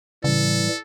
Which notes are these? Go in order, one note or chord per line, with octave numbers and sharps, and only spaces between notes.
A2 C#3 E3 G3 A4